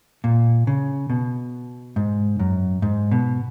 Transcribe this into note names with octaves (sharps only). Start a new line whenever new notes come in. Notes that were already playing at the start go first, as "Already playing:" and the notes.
A#2
C#3
B2
G#2
F#2
G#2
B2